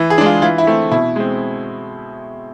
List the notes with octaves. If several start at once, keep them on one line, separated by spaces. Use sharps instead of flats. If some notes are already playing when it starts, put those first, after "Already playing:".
Already playing: E3
G#4
G#3 D4
F4
E3 F4
E4
A3 C4
B2 E4
G#3 C4